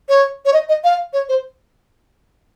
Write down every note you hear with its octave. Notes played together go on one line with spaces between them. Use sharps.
C#5
C#5
D#5
D#5
F5
C#5
C5